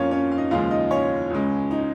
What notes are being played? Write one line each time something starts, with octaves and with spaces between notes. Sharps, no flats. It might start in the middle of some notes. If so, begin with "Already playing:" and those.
Already playing: F2 F3 A#3 C#4 F4 C#5 F5
C#4 C#5
F5
D#4 D#5
D#2 C#3 F3 G#3 F4 F5
D#4 D#5
C#4 C#5
C#2 C#3 G#3
D#4